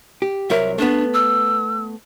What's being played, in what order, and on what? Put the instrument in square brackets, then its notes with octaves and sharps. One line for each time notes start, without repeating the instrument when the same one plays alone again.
[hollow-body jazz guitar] G4
[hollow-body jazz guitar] C2 F#3 A#4 [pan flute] E5
[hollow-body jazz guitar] A3 B3 [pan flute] D4
[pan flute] E6